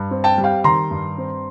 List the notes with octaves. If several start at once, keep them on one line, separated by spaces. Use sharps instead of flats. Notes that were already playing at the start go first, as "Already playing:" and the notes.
Already playing: G2
C4
G5 A5
G3
F5 G5
D#3 A#5 C6
G2
C4